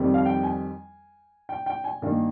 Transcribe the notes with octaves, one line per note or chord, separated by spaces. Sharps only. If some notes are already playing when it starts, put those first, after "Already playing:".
Already playing: F2 D#3 G3 C4
F5
G5
G#5
G5
G5
G#5
G2 D#3 A#3